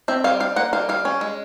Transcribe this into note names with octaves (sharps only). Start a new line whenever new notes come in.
C4 E5
G3 F5
G3 F5
A#3 F#5
G3 F5
G3 F5
C#4
G#3